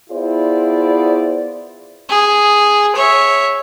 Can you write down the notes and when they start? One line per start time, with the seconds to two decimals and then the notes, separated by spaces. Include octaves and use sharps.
0.10 B3 E4 F4 G#4 C5 D5
2.10 G#4
2.95 C#5 E5